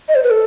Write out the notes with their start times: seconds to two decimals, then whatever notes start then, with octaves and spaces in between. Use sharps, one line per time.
0.09 D#5
0.15 C5
0.23 B4
0.30 A4